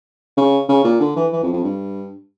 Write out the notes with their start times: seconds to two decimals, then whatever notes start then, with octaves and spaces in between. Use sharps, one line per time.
0.37 C#3
0.69 C#3
0.84 A#2
1.00 D3
1.16 E3
1.33 E3
1.43 F2
1.53 F2
1.64 G2